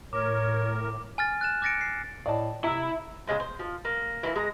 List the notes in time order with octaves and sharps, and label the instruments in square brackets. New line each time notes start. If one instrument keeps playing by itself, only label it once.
[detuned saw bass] A2 [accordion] A#4 [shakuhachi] C#5 [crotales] D6
[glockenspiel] G#5 F6 A6
F#6 A6 E7
D6 F#6 A6 A#6 C#7 D7
C7
[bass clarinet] A2 [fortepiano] D5 D#5 A5
[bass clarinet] C3 [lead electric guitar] E4 [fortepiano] A#5 E6
[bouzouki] C#3 F3 G#3 C5
C5
F3
A#3
E3 A#3 E4
G#3 A#5